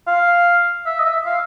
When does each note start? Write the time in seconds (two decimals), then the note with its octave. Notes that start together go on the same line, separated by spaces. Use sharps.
0.08 F5
0.86 E5
0.99 D#5
1.05 E5
1.25 F5